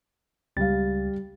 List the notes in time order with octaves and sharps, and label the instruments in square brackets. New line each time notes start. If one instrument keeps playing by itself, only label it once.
[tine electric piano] C#2 A6 [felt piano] G3 F5